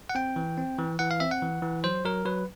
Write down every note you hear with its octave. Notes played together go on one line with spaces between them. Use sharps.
F#5
C4 G5
E3
C4
E3
E3 F#5
F5
C4 E5
F#5
E3
E3
F#3 C5
F#3 A#4
F#3 B4